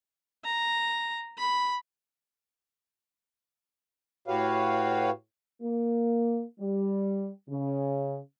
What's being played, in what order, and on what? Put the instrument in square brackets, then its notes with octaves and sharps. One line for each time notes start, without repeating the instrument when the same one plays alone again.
[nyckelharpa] A#5
B5
[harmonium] A2 F#4 G4 B4 C#5 F5
[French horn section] A#3
G3
C#3